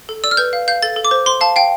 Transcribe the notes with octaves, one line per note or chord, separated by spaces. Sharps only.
A4
D5 E6
F6
B4 G6
F5
F5 G6
A4 A6
A4
D6
C5
C5 C6
F5 A5
F5 G5